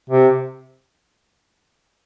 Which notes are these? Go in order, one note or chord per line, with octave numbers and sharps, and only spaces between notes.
C3